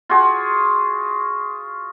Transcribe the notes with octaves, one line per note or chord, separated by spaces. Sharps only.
F4 F#4 G#4